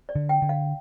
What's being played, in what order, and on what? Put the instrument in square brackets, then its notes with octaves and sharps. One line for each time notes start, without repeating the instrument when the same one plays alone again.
[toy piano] D5
[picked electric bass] D3
[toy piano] G5
[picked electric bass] D3
[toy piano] F5